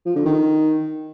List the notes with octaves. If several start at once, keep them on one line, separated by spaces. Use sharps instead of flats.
F3
D3
D#3